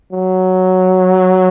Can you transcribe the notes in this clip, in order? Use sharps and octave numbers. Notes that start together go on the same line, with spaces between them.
F#3